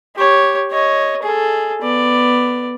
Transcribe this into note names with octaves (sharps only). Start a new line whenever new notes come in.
G4 C#5
C#5 D#5
G#4 A4
B3 D5